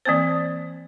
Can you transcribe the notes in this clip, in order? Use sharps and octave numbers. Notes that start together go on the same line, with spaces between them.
E3 A#3 C4 C5